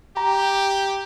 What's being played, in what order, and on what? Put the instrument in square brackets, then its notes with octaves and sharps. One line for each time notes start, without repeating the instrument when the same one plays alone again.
[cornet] G4 [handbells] A#5